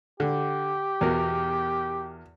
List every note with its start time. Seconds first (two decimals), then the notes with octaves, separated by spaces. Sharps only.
0.20 D3 G4
1.01 E2 B2 A#4